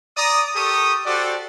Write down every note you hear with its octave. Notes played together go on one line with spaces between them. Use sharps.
D5 A#5 D#6
G4 A4 A#4 C#6 D#6
F#4 G4 A4 C5 D5